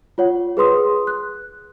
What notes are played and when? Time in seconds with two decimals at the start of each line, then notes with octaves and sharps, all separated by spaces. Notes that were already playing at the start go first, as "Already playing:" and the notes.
0.18 F4 C#5 F#5
0.57 G#4 B4 C6 D#6
1.07 F#6